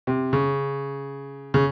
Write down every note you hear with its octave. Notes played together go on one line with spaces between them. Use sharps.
C3
C#3
C#3